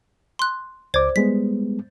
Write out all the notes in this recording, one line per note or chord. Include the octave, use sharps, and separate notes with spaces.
C6 F#6
C#2 C5 D5 D6 G#6
G3 G#3 B3 B6